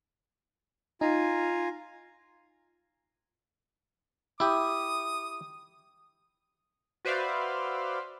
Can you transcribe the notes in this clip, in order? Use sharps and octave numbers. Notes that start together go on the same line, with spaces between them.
D#4 F4 G#5 A#5
E4 G4 D#6
F#4 B4 C5 D5 E5 F5